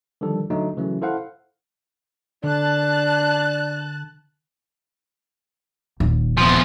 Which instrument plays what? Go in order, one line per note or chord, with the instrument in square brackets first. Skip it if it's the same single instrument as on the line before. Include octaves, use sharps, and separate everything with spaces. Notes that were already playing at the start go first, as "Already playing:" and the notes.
[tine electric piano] D3 D#3 F3 G3 A4
D3 F#3 A3 D#4
C#3 E3 F#3 A3 C#4
E4 A4 C5 F5 F#5
[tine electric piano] D3 [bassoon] D4 [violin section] A5 F#6
[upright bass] D#1
[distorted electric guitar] E2 F3